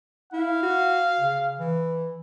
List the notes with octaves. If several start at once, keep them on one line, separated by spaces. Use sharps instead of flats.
E4 F5
F#4
C#3
E3